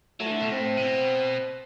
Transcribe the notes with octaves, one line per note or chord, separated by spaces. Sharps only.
F#3 A3
E3
D3
B2
A2 C4
C3
B2